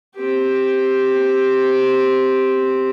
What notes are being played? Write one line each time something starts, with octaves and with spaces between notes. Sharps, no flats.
C4 G4